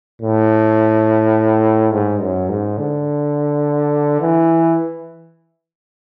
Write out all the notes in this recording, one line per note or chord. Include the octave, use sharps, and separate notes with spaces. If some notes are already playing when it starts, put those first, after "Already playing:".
A2
G#2
F#2
G#2
D3
E3